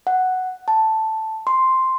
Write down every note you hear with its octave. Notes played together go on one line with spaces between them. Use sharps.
F#5
A5
C6